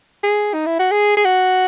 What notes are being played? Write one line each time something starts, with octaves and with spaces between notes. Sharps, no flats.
G#4
D#4
E4
F#4
G#4
G#4
F#4